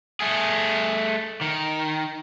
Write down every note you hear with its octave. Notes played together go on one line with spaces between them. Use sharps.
A3 G#4
D#3